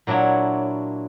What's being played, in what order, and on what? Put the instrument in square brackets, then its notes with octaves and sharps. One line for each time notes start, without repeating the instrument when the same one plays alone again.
[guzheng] A#2 F#3 D4 E4 C#5